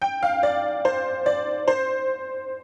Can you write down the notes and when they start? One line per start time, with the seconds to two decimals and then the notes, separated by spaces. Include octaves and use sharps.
0.02 G5
0.23 F5
0.43 D5
0.85 C5
1.26 D5
1.68 C5